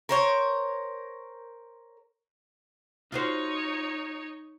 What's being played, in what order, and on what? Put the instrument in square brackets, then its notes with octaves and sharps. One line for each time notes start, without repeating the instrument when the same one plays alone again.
[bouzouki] A#4 C5 C#5
[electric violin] D#4 C#5 [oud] F4 F#4 C5